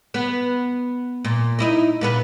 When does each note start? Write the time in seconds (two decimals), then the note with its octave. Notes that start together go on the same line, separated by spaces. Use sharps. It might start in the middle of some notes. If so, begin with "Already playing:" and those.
0.14 B3
1.25 A#2
1.59 D#4 E4 D#5
2.01 A#2 B3 B4